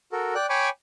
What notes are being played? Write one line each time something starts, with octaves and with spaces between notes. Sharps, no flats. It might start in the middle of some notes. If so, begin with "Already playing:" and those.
F#4 A4 A#4
D5 G5 F#6
C#5 G5 G#5 B5 C#6 D6